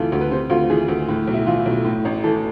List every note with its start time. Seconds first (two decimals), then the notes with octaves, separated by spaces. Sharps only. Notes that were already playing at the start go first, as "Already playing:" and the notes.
Already playing: D2 C3 E3 F4 A4
0.12 D2
0.21 B4
0.31 C3 C5
0.50 D2 F4
0.70 E3 G#4
0.88 D2
1.09 A2
1.27 B1
1.34 E4
1.46 E3 F4
1.66 B1
1.85 A2
2.05 A1
2.24 E3 A4